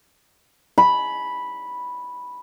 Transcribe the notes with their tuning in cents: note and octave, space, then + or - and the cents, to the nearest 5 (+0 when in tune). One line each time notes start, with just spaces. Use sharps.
G#5 +40 B5 -5